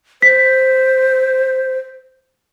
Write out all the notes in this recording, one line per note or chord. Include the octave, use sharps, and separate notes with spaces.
C5 B6